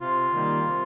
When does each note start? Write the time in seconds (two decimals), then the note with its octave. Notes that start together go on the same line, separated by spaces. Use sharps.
0.01 C3 F4
0.34 D#3 G3 A#3
0.67 C3